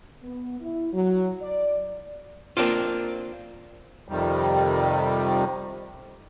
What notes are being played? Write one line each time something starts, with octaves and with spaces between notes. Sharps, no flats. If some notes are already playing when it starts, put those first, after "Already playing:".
B3
E4
F#3
D5
A#3 C4 D4 F4
F2 C3 D#3 G3